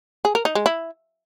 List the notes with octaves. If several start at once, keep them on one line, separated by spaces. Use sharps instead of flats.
G#4
A#4
D#4
G#3
E4